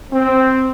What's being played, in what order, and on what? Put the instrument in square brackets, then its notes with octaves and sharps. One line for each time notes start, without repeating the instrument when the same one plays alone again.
[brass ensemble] C4